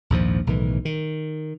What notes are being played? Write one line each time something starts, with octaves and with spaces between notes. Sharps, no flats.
A#1 D#2 G#2 F3
B1 A2 D#3 E3
D#3